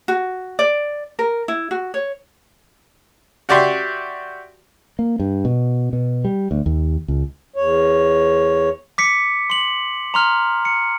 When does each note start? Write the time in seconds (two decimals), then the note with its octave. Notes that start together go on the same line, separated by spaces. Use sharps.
0.08 F#4
0.59 D5
1.19 A#4
1.48 E4
1.71 F#4
1.94 C#5
3.49 F#4 G4 D5 E5 C6 C#6
4.99 A#3
5.20 G2
5.45 B2
5.93 B2
6.25 G3
6.51 D2
6.66 D#2
7.08 C#2
7.56 E2 C#5
8.98 D6 B6 C#7
9.50 C6 F#7
10.14 A#5 C6 F6
10.65 C#7